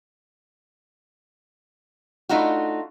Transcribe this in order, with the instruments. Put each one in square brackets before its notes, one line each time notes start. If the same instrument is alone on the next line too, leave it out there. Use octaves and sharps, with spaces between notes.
[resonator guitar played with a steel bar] A3 D4 D#4 F4 F#4